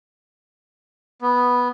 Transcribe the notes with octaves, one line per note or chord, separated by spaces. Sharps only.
B3